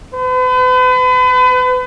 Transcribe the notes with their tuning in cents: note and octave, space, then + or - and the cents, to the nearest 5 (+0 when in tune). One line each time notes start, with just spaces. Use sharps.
B4 +40